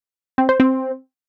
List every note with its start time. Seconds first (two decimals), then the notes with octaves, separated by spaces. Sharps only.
0.38 C4
0.49 C5
0.60 C4